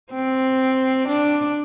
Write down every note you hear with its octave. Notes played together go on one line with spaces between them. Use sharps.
C4
D4